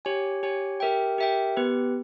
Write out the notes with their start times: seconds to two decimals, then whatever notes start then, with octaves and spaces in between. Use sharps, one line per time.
0.05 G4 C#5 G#5
0.43 G4 C#5 G#5
0.80 G4 A#4 E5 G5
1.18 G4 A#4 E5 G5
1.57 B3 G4 B4